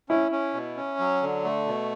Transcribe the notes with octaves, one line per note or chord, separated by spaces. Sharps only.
C#4 E4
C#4
B2
C#4
F#3
D3
A3
B2